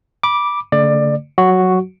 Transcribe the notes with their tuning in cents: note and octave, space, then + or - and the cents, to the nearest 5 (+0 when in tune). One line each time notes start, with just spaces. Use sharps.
B5 -20 D6 +0
D3 -40 A3 +30 D5 +20
F#3 +0 F#4 +0 C#6 +5